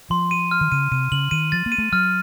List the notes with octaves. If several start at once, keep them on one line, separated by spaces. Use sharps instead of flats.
F3 C6
D#7
F6
D#3
C#3 D#7
C3 D#7
C#3 F#7
D#3 D#7
F3 A6
A#3
D#7
A3
F#3 F6